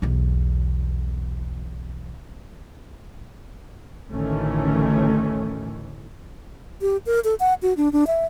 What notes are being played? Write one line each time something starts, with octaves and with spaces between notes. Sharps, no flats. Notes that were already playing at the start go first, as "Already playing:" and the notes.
B1 E2
A1 D2 D#3 E3 A3 C#4
G4
A#4
A4
F#5
F#4
D4
D4
E5